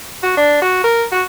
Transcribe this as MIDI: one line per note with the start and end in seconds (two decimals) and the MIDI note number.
0.23 0.36 66
0.37 0.60 62
0.62 0.79 66
0.84 1.05 70
1.12 1.23 66